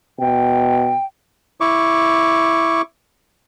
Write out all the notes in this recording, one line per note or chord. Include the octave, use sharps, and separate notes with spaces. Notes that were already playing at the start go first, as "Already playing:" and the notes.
B2 G5
E4 C#6 D6